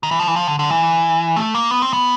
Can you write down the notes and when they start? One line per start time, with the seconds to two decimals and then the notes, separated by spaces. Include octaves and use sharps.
0.03 D#3
0.11 E3
0.20 F3
0.28 E3
0.36 F3
0.47 D3
0.59 D3
0.70 E3
1.36 A3
1.54 A#3
1.71 B3
1.82 C4
1.93 B3